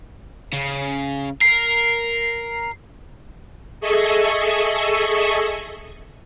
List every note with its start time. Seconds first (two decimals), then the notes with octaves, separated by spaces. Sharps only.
0.53 C#3
1.41 A#4 C7
3.80 G#4 A4 D#5 E5 C#6